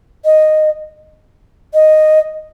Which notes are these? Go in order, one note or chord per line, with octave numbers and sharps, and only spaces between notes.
D#5
D#5